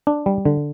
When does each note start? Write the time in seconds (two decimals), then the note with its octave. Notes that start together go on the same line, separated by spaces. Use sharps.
0.07 D4
0.26 G3
0.45 D3